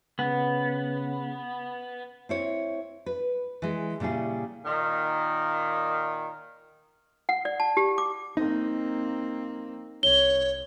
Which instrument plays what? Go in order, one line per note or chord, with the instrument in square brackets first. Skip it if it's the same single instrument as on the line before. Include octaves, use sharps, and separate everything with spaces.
[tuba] C#3 [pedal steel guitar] B3
[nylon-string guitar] C4 E4 C#5
B4
E3 G#3
A#2 C#3 G3 E4 G#4
[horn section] A#2 D#3
[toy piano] F#5
D5
A5
G4
D6
[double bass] A#3 C4 [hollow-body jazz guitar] D#4
[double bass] C2 [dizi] C#5 [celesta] G7